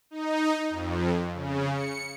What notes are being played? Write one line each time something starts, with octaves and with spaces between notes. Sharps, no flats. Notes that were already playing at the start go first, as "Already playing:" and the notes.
D#4
F2
C#3
C#7